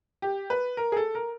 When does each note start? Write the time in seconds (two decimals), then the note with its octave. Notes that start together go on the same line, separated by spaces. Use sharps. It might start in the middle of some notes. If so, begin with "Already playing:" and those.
0.22 G4
0.50 B4
0.77 A#4
0.92 G#4
0.97 A4
1.15 A#4